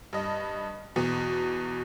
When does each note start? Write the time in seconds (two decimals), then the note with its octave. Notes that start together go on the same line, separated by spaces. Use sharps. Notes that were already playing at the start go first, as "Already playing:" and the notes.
0.13 G2 D#5
0.96 E2 B2